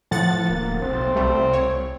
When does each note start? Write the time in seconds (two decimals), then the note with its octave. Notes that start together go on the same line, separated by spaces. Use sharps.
0.11 A2 F3 F#5 A6
0.50 D1 A#3
0.82 B1 C4
1.16 C2 G3 A3
1.53 C#5